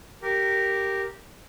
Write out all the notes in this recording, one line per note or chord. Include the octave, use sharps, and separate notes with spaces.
G4 A#4